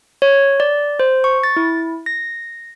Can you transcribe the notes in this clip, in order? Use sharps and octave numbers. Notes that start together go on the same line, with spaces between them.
C#5
D5
C5
C#6
A6
E4
A#6